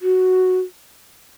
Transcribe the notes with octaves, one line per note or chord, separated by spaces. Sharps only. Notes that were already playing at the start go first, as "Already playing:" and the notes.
F#4